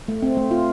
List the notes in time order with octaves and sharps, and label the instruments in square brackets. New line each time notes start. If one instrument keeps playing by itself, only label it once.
[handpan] A3
C4
A3
F4